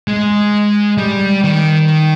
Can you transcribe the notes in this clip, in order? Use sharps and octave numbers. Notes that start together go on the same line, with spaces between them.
G#3
G3
D#3